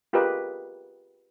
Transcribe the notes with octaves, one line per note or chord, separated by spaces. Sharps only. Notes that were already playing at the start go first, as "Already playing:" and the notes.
F4 G4 G#4 A#4 B4 D#5